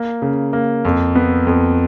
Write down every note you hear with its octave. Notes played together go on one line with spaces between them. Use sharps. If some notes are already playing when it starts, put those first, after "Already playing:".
Already playing: A#3
C#3
A#3
F2
B3
F2